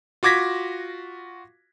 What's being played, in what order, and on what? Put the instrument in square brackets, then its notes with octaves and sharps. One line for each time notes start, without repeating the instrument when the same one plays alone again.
[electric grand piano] F4 F#4 D6 G#6 A#6 B6